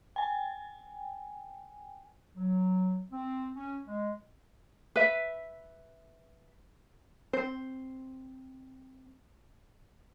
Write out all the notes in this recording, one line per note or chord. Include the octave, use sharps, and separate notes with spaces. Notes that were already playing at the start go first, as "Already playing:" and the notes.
G5 G#5
F#3
C4
C#4
G#3
B4 E5
C4 C5